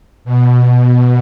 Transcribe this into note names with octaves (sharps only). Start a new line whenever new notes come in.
B2